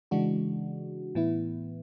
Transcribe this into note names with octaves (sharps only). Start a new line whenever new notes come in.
C#3 E3 G#3 D4 F#4
A2 E3 B3 E4